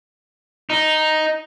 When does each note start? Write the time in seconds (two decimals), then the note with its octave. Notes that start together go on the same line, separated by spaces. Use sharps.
0.70 D#4